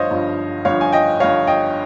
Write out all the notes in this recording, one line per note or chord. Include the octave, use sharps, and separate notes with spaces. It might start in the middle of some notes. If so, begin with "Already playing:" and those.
Already playing: G1 G2 F3 C5 C#5 D#5 F5
G1 G2 F3
G1 G2 F3 C#5 F5
G#5
D#5 G5
G1 G2 F3 C#5 F5
D#5 G5